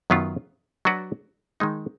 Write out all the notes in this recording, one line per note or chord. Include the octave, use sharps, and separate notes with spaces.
F#2 D#3 F#3 B3 F4
F#3 D4 F#4 B4 D5
D#3 G#3 D#4